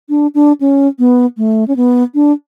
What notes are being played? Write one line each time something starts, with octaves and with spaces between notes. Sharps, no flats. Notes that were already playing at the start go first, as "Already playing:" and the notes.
D4
D4
C#4
B3
A3
C#4
B3
D4